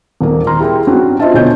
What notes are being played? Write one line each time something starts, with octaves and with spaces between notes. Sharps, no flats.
D#1 A#3
A#5 C6 F6
E4 G4 G#4 G5
G2 C4 C#4 F#4
F4 C5 D#5 E5 A5
D2 B2 C#5 D#5 G#5 G6